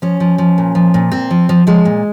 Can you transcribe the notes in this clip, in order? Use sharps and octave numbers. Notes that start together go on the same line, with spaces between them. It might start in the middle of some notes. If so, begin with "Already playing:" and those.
F3 C#4
F3
F3
A#2
F3
A#2
A#2 C4
F3
F3
F3 G#3
A#2